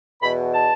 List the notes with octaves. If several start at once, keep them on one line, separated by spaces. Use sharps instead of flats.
E2 B2 B5
A5